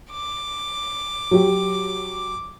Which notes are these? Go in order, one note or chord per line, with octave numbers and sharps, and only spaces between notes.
D6
F#3 G4